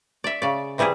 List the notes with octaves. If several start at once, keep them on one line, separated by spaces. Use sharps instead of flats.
D5 E5
C#3 D5
C3 E3 G3 E4 G#4